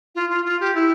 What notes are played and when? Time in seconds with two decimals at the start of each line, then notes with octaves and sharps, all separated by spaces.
0.15 F4
0.29 F4
0.45 F4
0.60 G4
0.75 E4